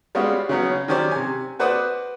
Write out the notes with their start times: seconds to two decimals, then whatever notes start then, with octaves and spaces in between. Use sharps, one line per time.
0.15 G3 G#3 B3 C#4 F4 F#4
0.49 C#3 F#3 B3
0.71 C#4
0.88 D#3 F#3 C#4 G4 C5 D5
1.11 C3 G#5
1.59 F#4 B4 C5 D5 F#5 D#6